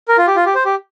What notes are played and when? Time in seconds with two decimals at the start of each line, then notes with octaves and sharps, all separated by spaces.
0.08 A#4
0.18 F4
0.27 G4
0.36 F4
0.46 G4
0.55 C5
0.65 G4